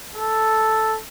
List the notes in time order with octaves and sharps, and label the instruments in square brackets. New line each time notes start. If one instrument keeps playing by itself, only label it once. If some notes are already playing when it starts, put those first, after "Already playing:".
[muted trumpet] A4